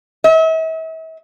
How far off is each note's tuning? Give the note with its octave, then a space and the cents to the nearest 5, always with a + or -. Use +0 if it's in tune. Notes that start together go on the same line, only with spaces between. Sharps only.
E5 -40